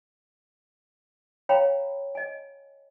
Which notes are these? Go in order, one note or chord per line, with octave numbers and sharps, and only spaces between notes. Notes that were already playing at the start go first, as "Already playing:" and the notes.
C#5 F5 G5 A#5 B5
D#5 G#5